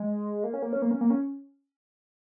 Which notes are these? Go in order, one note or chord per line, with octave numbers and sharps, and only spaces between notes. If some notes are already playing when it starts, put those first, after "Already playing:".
Already playing: G#3
A#3
C#4
A#3
C#4
A#3
C#4
A#3
C#4